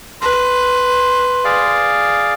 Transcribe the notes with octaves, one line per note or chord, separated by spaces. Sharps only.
B4 C6
G#4 D5 F5